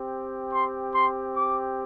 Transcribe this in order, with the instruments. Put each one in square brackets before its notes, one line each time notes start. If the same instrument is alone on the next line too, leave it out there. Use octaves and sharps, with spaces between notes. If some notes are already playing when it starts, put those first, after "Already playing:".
Already playing: [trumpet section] C4 G4
C6
C6
D6